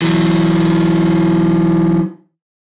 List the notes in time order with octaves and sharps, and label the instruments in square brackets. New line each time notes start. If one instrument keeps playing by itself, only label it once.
[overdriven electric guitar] E3 F#3